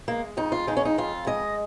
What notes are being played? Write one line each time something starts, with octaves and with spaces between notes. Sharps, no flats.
G#3 A#3
F2 D#4
F4
G#3 D#4
C#4
D#4
F2 F4
G#3 D#5